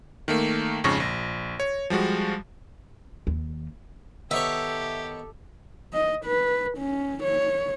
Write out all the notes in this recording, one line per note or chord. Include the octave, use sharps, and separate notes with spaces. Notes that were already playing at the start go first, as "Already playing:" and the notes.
D#3 A3 A#3
F2 G#2 C#3 C#6 A#6
A#1
C#5
F3 G3 G#3 F#4
D#2
D#3 B3 G4 A4 C#5 E5
D#5
B4
C#4
C#5